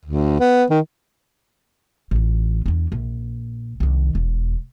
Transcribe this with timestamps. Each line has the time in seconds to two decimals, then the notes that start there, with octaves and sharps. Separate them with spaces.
0.05 D2
0.40 B3
0.70 D#3
2.11 A1 F4
2.66 E2 D4
2.92 A#1
3.80 C2 D#3
4.15 E1 E2